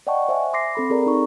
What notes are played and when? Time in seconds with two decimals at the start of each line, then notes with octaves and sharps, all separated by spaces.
0.07 D5 D#5 F#5 G5 A5 C#6
0.29 C5 E5 G#5
0.53 C6 D6 A#6 C7
0.75 C4 A4 B5
0.90 C4 G#4 A#4 D5 A#5
1.06 D#4 C#6